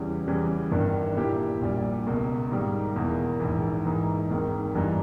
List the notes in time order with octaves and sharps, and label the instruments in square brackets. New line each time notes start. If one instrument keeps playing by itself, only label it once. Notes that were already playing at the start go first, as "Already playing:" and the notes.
Already playing: [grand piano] E2 C#3 E3 G3
E2 C#3 E3 G3
G1 G2 D#3
A#2 A#3 E4 G4
A#1 A#2 G3
C#2 B2 A#3
G#2 D#3 G3 A#3
E2 B2 A#3 E4 A#4
A#1 G#2 E3
G#2 E3 A#3 D#4
G#1 G#2 D#3 A#3
G2 E3 G3 A#3 D#4